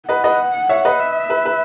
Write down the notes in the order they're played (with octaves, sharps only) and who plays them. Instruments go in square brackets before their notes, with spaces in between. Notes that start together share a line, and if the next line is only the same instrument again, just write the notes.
[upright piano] B4 D#5 [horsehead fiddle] F#5
[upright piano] B4 D#5
C#5 E5
B4 D#5
[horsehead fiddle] E5
[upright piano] B4
B4